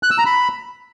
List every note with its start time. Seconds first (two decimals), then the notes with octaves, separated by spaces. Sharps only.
0.03 F#6
0.11 E6
0.18 A#5
0.26 B5